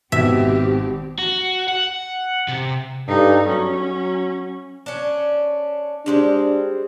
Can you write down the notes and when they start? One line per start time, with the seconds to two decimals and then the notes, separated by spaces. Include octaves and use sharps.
0.12 G#1 B2 C4 G4 E5
1.19 F#4
1.68 F#5
2.48 C3
3.07 G2 D#4 A4
3.48 F#3 C#4
4.86 C#4 D4
6.06 G3 G#3 C4 D4